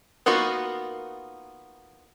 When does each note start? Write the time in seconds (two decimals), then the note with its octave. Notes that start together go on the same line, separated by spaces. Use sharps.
0.26 A#3 B3 D#4 F4 F#4